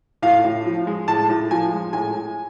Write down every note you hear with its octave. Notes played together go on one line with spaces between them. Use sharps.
A2 F5
A2
F3
G#3
A2 A5
A2
F3 G#5
G#3
A2 G#5